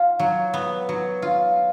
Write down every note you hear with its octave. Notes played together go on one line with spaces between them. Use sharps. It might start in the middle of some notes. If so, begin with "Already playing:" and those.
Already playing: F4
F#3
B3
F#3
F4